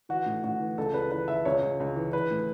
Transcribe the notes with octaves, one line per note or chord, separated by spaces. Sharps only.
E3 F#4
A2
A2 F#4
E3
C#2 A4
C#2 B4
E3 B4
E3 E5
C#2 C#5
C#2
C#2
E3
E3 B4
A2